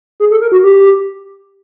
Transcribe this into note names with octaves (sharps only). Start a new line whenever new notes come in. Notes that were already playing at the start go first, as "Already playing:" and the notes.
G#4
A4
A#4
F#4
G4